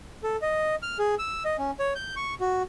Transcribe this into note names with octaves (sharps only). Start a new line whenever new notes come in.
A4
D#5
F6
G#4
E6
D#5
C#4
C#5
G6
C#6
F#4